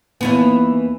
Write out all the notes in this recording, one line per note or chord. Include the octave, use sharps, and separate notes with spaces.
D#2 E3 B3